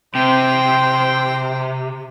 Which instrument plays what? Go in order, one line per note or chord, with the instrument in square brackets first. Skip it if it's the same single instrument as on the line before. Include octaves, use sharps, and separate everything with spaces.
[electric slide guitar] C3 [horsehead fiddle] C5 [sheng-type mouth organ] G5